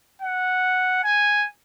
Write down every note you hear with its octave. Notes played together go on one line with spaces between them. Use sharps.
F#5
G#5